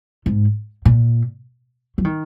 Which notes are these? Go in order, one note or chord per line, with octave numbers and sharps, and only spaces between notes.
G#2
A#2
F#3
D#3